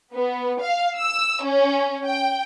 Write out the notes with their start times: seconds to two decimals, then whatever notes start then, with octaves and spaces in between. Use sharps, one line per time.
0.13 B3
0.60 F5
0.97 E6
1.44 C#4
2.05 G5